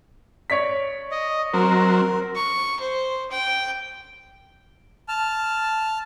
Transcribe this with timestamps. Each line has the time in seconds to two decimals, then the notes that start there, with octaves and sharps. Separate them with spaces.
0.50 C#5 D5 B6
1.11 D#5
1.54 F#3 C4 A#4
2.36 C#6
2.80 C5
3.31 G5
5.08 A5 F6